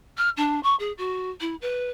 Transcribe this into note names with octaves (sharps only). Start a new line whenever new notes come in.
F6
D4
C#6
G#4
F#4
E4
B4